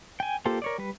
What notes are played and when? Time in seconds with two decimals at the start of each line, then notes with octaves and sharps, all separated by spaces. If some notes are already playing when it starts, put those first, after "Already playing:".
0.20 G5 G#5
0.46 A#3 F4 G4 A4 C5
0.62 A#4 C#5 D5
0.78 G3 B4